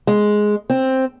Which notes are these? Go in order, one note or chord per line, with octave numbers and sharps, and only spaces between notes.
G#3
C4